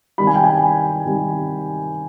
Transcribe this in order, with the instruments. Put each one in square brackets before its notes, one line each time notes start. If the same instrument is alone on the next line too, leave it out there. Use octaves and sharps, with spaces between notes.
[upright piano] C3 D#3 G3 B5
G#5
G5
G#5
C3 D#3 G3